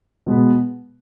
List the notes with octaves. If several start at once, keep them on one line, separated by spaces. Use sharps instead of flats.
B2 G#3 B3